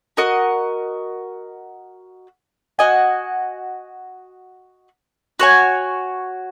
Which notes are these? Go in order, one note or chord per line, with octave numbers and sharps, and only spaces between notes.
F#4 A#4 D#5
F#4 D#5 G#5
F#4 C#5 G#5